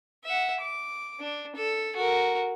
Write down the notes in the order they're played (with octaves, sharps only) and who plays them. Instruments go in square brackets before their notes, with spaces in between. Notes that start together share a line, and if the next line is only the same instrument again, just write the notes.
[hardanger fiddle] E5 F#5
D6
D4
A4
F#4 A#4